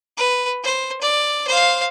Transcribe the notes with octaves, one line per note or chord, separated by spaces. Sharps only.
B4
C5
D5
C5 F5